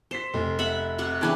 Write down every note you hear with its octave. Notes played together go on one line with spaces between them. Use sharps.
C5 B6 C7 E7
F1
E5 F#5 B5
C3 F#5 C#6
C#3 E3 D4 G5 A5 G#6